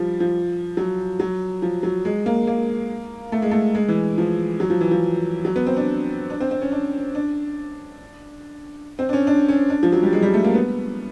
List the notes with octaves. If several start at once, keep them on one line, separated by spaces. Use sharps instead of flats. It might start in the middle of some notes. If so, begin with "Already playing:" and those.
Already playing: F3 G3
F3
F#3
F#3
F3
F#3
G#3
A#3
A#3
A3
G#3
A3
G#3
E3
F3
F#3
F3
E3
F3
F#3
B3
C4
D4
D4
C4
C4
C#4
D4
D4
C4
D4
C#4
D4
C#4
D4
F3
F#3
G3
G#3
G3
A3
A#3
B3